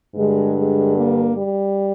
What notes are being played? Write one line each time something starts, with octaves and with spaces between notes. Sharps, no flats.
G2 D3 G#3
G#3
A#3
G3